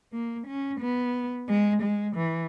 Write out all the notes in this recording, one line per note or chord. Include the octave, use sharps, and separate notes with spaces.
A#3
C#4
B3
G#3
G#3
E3